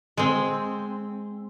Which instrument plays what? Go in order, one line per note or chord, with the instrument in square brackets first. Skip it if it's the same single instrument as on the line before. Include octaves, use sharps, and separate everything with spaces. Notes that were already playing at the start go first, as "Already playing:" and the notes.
[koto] G#3 C4